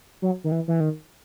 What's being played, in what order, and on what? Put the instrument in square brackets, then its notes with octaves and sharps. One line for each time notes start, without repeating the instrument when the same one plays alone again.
[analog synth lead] F#3
D#3
E3
E3
D#3